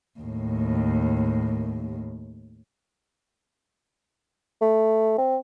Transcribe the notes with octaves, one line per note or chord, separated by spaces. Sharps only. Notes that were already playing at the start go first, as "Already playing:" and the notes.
D#2 A2
A3
C4